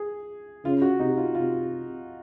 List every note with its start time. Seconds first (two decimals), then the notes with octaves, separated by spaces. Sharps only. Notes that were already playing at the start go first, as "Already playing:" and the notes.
Already playing: G#4
0.65 C#3 F4
0.82 F#4
0.99 C3 D#4
1.18 F4
1.35 C3 F4